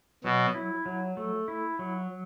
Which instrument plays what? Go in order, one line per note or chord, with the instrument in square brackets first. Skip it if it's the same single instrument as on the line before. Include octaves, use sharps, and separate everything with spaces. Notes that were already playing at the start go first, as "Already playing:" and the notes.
[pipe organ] B2 [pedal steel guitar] F#3
[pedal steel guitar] E4
F#3
A3
E4
F#3